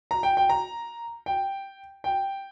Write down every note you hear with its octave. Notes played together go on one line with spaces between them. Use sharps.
A#5
G5
G5
A#5
G5
G5